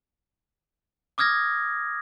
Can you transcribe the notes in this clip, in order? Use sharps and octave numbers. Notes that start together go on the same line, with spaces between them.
D6 D#6 F6 G#6 A#6